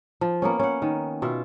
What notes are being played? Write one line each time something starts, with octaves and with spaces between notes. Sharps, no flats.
F3
A#3 B3 C#4
C#4 F#5
D#3
B2 F4 E5